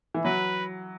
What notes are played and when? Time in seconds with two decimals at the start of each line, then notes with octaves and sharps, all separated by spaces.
0.14 E3
0.25 F#3 B4